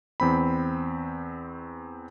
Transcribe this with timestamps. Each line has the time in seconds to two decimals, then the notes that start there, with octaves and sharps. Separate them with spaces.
0.20 E2 C4 B5